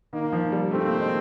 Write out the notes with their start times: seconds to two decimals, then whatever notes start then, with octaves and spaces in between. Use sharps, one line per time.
0.13 D#3 A#3
0.33 F3
0.52 G3
0.71 A3 C4
0.86 A#3
1.00 G#3